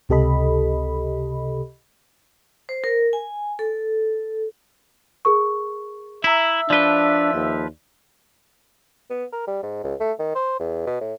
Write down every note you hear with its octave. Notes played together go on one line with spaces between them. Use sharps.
C#2 C3 G4 A4 D#5 B5
C5
A#4
G#5
A4
G#4 A#4 C#6
E4 E5 A#5 F#7
F3 D4 B4 D5 G7
D#2
B3
A#4
G3
G#2
C#2
A3
D#3
C5
E2
B2
A2